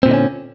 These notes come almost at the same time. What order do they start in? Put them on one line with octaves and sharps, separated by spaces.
C4 A#2 D3 D#4 C#4